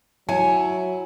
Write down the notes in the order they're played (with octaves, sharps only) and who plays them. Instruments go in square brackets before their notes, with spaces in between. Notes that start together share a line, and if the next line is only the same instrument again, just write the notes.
[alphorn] F#3 [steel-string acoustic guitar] E4 [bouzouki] C#5 [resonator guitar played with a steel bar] G#5